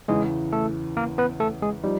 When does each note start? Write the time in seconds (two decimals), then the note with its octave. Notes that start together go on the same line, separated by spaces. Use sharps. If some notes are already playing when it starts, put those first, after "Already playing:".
0.08 E2 C#3 E3 G#3 G#4
0.53 A3 A4
0.97 A#3 A#4
1.18 B3 B4
1.40 A3 A4
1.62 G#3 G#4
1.84 F3 G3 D#4